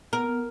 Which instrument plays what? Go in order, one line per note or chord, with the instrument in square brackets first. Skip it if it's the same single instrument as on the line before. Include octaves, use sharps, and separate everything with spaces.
[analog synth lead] B3 [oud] A#4
[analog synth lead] B3